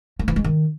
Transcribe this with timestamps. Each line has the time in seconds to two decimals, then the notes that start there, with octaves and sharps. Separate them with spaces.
0.19 A3
0.28 E3
0.36 G#3
0.44 D#3